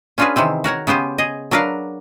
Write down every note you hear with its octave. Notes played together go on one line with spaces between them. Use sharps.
C#4 D4 F4 F#4 G#4 B4
C3 D#3 E3 C4
F#4 A#4 C#5 F#5
C#3 B3 G4 C5 G#5
G#4 D#5
F#3 D4 A#4 B4 F5